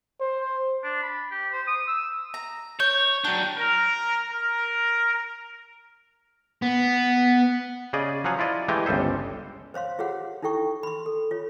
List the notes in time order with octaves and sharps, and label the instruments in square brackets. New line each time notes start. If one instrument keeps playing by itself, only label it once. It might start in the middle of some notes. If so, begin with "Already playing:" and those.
[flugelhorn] C5
[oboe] D4
B5
G4
C5
D#6
E6
[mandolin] A#5
[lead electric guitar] C#5 [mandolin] G6
[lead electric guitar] F#3 D4 [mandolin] G5
[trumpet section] A#4
A#4
[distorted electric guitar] B3
[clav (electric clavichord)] C#3 G#4 D5 D#5
F3 F#3 F5 F#5 G#5
E4 F4 D5 D#5
E3 G#3 A3 G4 D#5
G1 C#2 G3 A4 C5
[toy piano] C5 C#5 F5 C6
F4 G4 G#4 C#5 F#5
D#4 E4 A4 G5 C#6
B5 C6
A4
F4 C#5